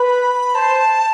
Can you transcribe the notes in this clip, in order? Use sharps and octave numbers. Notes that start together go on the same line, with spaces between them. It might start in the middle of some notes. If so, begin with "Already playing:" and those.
Already playing: B4 B5
C5 A5